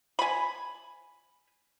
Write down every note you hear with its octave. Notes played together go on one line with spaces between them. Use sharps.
G#5 B5